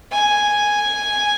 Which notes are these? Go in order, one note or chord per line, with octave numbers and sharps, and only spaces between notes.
G#5